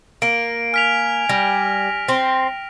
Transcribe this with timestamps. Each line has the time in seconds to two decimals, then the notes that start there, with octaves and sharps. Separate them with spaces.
0.22 A#3 D7
0.74 G#5 F6 B6 F7
1.29 G3 A#6
2.09 C4